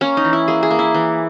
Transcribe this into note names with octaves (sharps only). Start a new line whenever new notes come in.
A#3 C#4
D#4
E3
E4
A#3 G#4
G#4
A#3
E4
E3